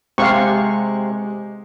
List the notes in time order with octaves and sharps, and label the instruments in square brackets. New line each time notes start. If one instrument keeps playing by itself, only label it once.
[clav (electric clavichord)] C3 [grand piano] G#3 C4 G4 [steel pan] F5 F#5 C#6